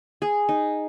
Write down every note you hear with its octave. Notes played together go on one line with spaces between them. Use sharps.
G#4
D#4